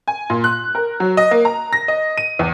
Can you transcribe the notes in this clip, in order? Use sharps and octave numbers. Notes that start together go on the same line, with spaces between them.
G#5
A#2
F#6
A#4
F#3
D#5
A#3
A#5
A#6
D#5
D#7
E2